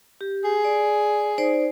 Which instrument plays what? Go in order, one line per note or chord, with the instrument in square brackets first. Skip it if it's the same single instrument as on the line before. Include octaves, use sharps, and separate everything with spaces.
[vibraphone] G4
[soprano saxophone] G#4
[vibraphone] D5
D#4 C5 D5